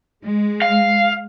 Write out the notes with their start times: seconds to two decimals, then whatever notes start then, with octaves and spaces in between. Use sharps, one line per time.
0.23 G#3
0.62 F5